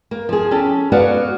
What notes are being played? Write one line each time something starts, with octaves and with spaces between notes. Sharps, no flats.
A#3
F3 G#4
C#4 G4 A4
B3 F#4 C#5 D5 F5